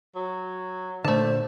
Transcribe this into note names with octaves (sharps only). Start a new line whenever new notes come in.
F#3
A#2 D3 A3 C5 A5